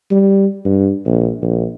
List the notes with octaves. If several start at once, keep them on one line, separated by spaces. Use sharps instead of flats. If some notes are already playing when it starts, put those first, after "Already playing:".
G3
G2
A#1
A#1